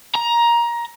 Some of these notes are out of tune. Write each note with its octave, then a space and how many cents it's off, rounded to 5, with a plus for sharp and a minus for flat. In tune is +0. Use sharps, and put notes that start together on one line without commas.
A#5 +15